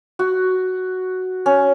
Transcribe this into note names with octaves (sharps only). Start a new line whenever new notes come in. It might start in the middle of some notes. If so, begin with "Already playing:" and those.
F#4
C#4